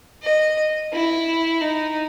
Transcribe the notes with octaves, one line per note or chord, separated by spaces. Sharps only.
D#5
E4
D#4